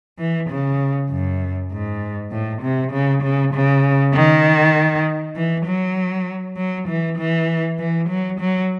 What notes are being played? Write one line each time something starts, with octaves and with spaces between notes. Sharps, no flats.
E3
C#3
F#2
G#2
A2
C3
C#3
C#3
C#3
D#3
E3
F#3
F#3
E3
E3
E3
F#3
F#3